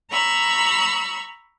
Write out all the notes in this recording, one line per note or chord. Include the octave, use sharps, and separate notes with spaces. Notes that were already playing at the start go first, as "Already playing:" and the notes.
A#5 B5 C#6 E6